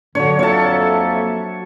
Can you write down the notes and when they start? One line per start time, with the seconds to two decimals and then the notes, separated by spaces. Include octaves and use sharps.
0.15 D3 F#3 D4 C#5
0.39 F2 A#3 A4 C#5 E5 A5